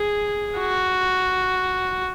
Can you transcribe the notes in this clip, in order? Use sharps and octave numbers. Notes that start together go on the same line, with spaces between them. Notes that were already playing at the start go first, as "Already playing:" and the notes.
Already playing: G#4
F#4